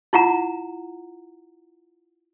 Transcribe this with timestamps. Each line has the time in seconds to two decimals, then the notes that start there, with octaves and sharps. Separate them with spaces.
0.13 E4 F4 F#5 A#5